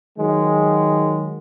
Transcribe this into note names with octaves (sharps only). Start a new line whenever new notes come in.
D#3 F#3 G#3